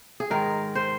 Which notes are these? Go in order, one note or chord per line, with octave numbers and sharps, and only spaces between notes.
G#4
G#2 D#3 G#3 A#4
C5